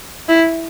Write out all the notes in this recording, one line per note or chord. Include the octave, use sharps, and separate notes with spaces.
E4